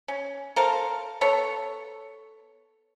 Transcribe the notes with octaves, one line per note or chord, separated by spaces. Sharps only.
C#4
A4 A#4 C5 F5
B3 A4 C#5